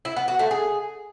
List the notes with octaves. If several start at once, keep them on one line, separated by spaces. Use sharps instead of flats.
E4
B3
F#4
A3
G#4